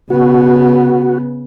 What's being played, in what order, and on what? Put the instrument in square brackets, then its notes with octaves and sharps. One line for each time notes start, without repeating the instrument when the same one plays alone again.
[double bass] C#3 B3 [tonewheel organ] F#4